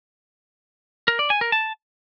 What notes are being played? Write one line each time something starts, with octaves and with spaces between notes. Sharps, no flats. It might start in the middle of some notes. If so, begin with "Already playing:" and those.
A#4
D5
G#5
A#4
A5